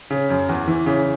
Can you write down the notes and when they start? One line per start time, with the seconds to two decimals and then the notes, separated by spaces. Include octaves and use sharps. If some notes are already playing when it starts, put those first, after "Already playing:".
0.10 C#3
0.30 F#2
0.49 E2
0.68 E3
0.86 C#3